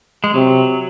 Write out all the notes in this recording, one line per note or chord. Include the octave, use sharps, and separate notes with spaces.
G#3
C3 F#3